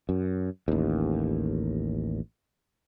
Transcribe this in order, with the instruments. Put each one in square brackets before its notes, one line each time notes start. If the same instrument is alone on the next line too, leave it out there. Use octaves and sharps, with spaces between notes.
[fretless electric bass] F#2
A1 D#2